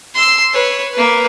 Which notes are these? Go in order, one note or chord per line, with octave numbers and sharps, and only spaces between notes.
C6 E6
B4 C#5
A#3 B4